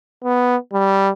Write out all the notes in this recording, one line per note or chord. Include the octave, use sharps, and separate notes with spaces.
B3
G3